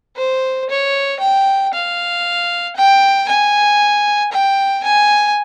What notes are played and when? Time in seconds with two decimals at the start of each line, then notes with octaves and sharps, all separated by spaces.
0.16 C5
0.69 C#5
1.20 G5
1.73 F5
2.77 G5
3.29 G#5
4.32 G5
4.84 G#5